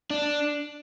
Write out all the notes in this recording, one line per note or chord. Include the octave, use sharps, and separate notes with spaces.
D4